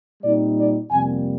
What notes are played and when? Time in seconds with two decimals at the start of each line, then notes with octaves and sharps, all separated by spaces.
0.22 A#2 G3 C4 D#4 D5
0.57 D5
0.91 F2 C3 G3 A#3 G#5